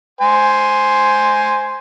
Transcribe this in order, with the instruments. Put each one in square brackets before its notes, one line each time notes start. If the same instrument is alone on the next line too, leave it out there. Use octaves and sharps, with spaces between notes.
[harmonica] C5 G#5